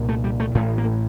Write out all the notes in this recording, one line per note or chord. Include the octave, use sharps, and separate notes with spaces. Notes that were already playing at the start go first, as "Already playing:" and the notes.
Already playing: C2 A#2
A3
G3
A3
A1 A2 A3
A#3